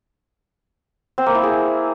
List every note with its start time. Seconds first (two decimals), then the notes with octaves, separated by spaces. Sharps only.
1.18 C4
1.26 A#3
1.35 E4
1.43 G#4